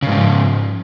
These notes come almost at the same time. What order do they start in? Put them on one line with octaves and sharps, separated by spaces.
C#3 G#2 F3